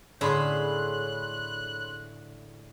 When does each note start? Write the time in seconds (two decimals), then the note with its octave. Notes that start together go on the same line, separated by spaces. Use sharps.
0.21 A2 D3 G#4 C#5 B5 C6 F#6